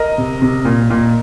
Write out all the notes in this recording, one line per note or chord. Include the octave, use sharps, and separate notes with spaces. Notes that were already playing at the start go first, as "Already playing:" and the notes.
Already playing: A#4 D#5
C3
C3
A#2
A#2